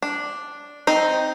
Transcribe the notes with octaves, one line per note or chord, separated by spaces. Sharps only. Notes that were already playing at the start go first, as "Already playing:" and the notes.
D4
C4 D#4